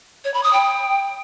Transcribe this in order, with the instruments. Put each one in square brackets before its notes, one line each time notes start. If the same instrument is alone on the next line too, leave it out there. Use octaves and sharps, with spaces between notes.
[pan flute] C#5
B5
D#6
G5